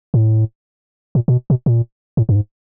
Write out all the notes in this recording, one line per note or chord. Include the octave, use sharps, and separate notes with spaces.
A2
A#2
A#2
B2
B2
A#2
A2
G2
G#2